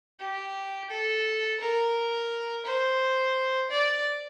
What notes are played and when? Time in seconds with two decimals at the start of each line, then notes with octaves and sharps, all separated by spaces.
0.20 G4
0.90 A4
1.60 A#4
2.65 C5
3.71 D5